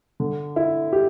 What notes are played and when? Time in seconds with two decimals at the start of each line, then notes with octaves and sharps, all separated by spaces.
0.20 D3
0.56 E4
0.93 G4